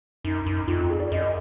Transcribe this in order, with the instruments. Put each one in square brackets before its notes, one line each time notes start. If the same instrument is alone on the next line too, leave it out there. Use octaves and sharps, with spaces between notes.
[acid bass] F#2 [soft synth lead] D#4
[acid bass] F#2 [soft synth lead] D#4
[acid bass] F2 [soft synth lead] F4
[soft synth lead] F4
G#4
D5
[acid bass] F#2 [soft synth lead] D#5